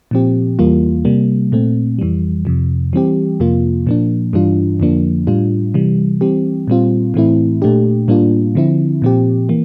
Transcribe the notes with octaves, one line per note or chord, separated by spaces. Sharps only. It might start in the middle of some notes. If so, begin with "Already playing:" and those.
A#2 F3 C4 G4
E2 E3 G3 A#3 F4
C3 G3 A#3
A#2 A3 C4
F2 E3 G3
F2 C3 F3
E3 G3 C4 G4
F2 C3 F3 A#3 F4
A#2 F3 A#3 D4
G2 E3 G3 D4 F4
F2 D3 F3 A#3 D4
A2 G3 D4 F4
C3 E3 G3
E3 G3 C4 G4
A#2 G3 C4 F4
A2 E3 A3 C4 E4
A#2 A3 D4 G4
A2 G3 A#3 D4 F4
D3 F3 C4 E4
A#2 F3 C4 G4
E3 A#3